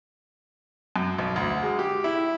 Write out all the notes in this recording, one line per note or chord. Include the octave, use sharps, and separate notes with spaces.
F#2
B1
D2
G#3
G4
E4